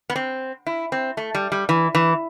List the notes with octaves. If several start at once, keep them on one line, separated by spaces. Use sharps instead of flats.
B3
C4
E4
C4
A3
G3
G3
E3
E3